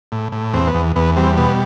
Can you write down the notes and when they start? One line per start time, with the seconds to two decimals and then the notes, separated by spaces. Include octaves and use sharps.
0.12 A2
0.32 A2
0.54 E2 C4
0.68 B3
0.75 E2
0.96 E2 B3
1.17 G3 C4
1.37 B2 B3